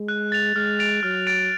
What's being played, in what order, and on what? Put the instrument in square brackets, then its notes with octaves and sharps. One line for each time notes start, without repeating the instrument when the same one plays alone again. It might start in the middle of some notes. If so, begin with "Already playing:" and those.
Already playing: [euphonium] G#3
[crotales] F#6
A6 F7
[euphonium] G#3 [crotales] F6
[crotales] A6 D7 F7
[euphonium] F#3 [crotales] F6
[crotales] A6 D7 F7